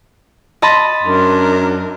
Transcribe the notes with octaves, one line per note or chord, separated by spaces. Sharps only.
D#5 A5 B5 C6
F#2 D4 A#4